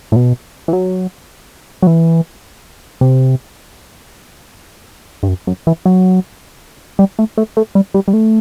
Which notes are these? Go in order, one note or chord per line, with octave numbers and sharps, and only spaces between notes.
A2
B2
E3
F#3
F#3
E3
C3
G2
F#2
F#2
E3
F#3
G3
A3
A3
A3
G3
G3
G3
A3